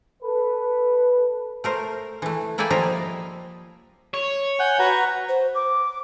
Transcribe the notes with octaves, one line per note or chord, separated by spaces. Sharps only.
A4 B4
A3 A#4 C5
E3 A3
A#3 E4 A4 D5 G5 G#5
F3 G3 D#5 E5 A#5
C#5
F#5 G#5 G6
F#4 B4 A#5
C5
D6